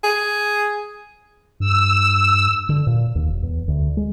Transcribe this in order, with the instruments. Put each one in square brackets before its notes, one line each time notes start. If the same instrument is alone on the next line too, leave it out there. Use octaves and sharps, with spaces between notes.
[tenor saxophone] G#4
[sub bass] G2 [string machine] E6
[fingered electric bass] D3
A#2
D#2
E1
E2
D2
G#3